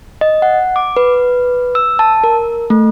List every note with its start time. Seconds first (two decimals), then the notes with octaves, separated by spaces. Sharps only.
0.21 D#5
0.42 F#5
0.76 D6
0.97 B4
1.75 E6
1.99 A5
2.24 A#4
2.70 A3